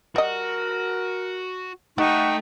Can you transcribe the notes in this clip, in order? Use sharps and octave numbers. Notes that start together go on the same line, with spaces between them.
G3 F#4 A#4 D#5
A3 D#4 G4 A4 F#5 G5 C#6